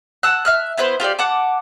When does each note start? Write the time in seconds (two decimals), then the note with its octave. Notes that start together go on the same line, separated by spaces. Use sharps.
0.23 F#5 A5 E6 F#6
0.45 E5 F6 F#6
0.77 B3 E4 B4 C5
1.00 F4 G4 A4 D5
1.19 F#5 A5 D6